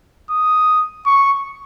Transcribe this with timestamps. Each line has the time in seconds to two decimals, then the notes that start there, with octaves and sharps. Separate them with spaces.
0.30 D#6
1.06 C#6